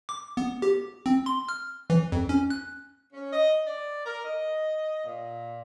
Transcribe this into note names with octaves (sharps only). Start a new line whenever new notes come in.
D6
B3
G4
C4
C6
F6
E3
F2
C#4
F#6
C#4
D#5
D5
A#4
D#5
A#2